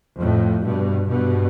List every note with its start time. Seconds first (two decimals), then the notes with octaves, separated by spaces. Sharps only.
0.20 F2 A2
0.64 G2 B2
1.08 G2 B2